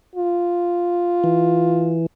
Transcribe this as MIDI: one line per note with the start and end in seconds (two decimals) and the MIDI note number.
0.15 1.99 65
1.24 2.06 52